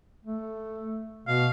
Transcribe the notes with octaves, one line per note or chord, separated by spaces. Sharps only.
A3
B2 F5